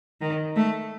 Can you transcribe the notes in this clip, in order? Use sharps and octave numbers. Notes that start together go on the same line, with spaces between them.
D#3
A3